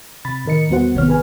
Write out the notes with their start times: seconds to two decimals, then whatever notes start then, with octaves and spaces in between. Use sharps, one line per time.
0.25 C3 B5 A6
0.45 A2 D#3 A#4 D#5 C#7
0.69 E2 G3 B3 F#4 C5 F#5
0.94 G#1 C3 D#3 B3 C#5 F6
1.08 G#4 B4 G#5